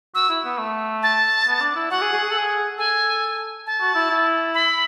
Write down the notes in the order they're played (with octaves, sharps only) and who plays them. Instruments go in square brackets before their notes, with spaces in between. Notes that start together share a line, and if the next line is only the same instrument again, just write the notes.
[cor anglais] F#4 [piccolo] E6
[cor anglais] E4
B3
A3
[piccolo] A5
[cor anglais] B3
D4
E4
[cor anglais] F#4 [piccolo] F#5
[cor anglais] G#4
G#4
G#4
A4
G#4
[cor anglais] A4 [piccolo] G#5
[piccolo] A5
[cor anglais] F#4
E4
E4
[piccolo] B5